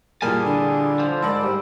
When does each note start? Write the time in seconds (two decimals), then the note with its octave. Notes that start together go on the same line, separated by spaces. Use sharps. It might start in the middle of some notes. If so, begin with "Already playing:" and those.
0.22 A#2 E3 G3 A#3 G#4 G#5 A5
0.45 D3
1.00 F3 C5
1.22 G#2 E4 A#4 D5 A5
1.43 G3 C5